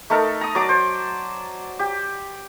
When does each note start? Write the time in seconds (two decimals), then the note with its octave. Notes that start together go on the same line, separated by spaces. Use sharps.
0.10 A3 D#4 A4 A#4
0.41 A#5 D#6
0.55 F#3 D5 A5 D6
0.69 C5
1.79 G4